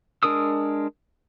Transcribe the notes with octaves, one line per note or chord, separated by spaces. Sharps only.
G#3 D4 A#4 D#6 E6